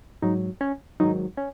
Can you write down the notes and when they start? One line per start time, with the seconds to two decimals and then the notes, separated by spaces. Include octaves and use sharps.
0.22 G#2 F#3 D#4
0.61 C#4
1.00 G#2 D#3 F#3 D#4
1.37 C#4